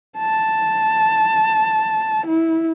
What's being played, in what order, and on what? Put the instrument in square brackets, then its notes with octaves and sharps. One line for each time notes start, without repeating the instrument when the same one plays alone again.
[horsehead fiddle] A5
E4